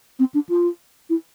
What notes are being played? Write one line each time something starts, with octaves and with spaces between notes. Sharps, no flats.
C4
D4
F4
E4